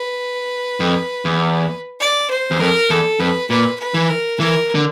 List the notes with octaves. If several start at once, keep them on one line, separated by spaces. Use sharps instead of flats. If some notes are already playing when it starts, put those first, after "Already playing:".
Already playing: B4
F2
E2
D5
C5
E2
F2 A#4
E2 A4
F2 B4
A#2 B4
B4
E3
A#4
E3 A#4
D3